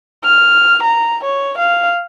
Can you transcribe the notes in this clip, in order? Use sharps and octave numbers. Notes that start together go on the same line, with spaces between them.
F6
A#5
C#5
F5